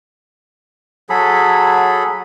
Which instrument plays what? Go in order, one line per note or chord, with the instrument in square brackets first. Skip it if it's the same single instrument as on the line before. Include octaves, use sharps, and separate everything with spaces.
[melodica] F#3 G#4 A4 B5